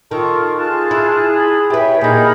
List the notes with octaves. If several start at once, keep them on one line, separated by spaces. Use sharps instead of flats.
D#3 F4 A4 C#6
F4 G#4 A5 F#6
E4
B5
G4 B4 C#5 E5 G5
A#2 D#4 G#4 A#4 B5 G6